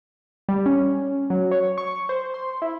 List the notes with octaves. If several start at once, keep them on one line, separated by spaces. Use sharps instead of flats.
G3
C#4
F#3
C#5
C#6
C5
C6
E4